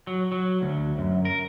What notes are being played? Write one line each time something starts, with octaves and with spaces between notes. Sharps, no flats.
F#3
F#3
D2
F#2
A#4